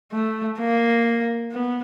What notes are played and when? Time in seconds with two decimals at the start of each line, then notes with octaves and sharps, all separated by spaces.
0.12 A3
0.59 A#3
1.52 B3